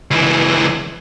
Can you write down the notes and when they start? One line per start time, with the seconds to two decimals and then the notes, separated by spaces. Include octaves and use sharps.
0.11 C#2 E3